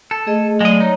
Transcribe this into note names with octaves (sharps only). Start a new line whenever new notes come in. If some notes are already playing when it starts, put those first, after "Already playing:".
A4
A3 G#4 D#5
F#3 G#3 A3 D5 D#5
D#4 C#5 A#5